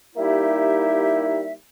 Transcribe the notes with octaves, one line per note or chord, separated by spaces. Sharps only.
G3 A#3 D#4 E4 G4 E5